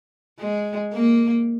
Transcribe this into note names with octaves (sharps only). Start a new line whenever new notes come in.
G#3
A#3